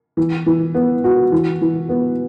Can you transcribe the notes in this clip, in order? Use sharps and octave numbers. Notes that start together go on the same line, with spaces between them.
E3
E3
B3
F#4
E3
E3
B3